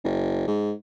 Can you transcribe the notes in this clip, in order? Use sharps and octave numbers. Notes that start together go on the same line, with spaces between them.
F#1
G#2